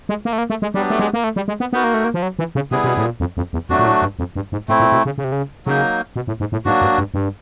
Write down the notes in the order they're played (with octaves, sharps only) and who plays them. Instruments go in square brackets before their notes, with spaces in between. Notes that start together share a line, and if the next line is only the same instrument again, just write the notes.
[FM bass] G#3
A#3
A3
A#3
A3
G#3
[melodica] F#3 B3 D4 G4 [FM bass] G3
[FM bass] A3
G#3
A#3
A3
G3
G#3
B3
[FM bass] B3 [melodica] D#4 F#4 A#4
[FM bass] A#3
A3
A#3
F3
F#3
E3
C#3
[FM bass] C3 [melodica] G3 B3 E4 G#4
[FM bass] C3
B2
A2
A#2
F2
F2
E2
[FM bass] F2 [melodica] F#3 A3 D4 F#4
[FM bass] A#2
A2
G2
F2
G2
G#2
[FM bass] A2 [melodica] A3 C4 E4
[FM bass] A#2
B2
C#3
C#3
C3
C#3
[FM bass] C#3 [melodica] F#3 A#3 D#4
[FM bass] B2
A2
G#2
A2
[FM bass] G#2 [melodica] F#3 A#3 D4 F#4
[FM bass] G2
G2
G2